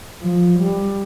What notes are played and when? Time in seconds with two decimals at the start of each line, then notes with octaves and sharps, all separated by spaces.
0.22 F3
0.59 G3